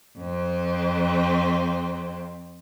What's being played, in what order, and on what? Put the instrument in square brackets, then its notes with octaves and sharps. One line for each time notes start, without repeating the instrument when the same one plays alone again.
[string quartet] F2 C4